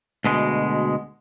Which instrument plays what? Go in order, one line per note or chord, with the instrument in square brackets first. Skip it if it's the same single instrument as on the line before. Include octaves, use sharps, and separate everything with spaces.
[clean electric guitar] D2 B2 G#3